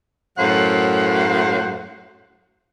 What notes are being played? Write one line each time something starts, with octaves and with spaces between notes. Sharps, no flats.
F#2 A2 F#3 C5 F5 F#5